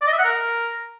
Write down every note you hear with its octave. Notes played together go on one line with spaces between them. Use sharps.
D5
D#5
E5
F#5
A#4